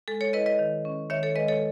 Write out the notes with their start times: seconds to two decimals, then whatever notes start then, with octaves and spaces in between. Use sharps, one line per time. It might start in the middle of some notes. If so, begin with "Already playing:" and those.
0.08 G#3 A4
0.21 A4 C#5
0.33 E4 B4 D#5
0.46 B4 D#5
0.59 D#3
0.85 C#4
1.10 D#3 C#5 E5
1.23 A4 C#5
1.36 G#3 B4 D#5
1.48 A4 C#5